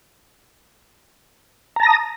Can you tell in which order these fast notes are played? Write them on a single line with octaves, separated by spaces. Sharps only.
A#5 A5 A#6 D#6